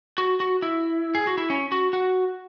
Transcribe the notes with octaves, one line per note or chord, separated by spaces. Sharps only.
F#4
F#4
E4
G#4
F#4
E4
C#4
F#4
F#4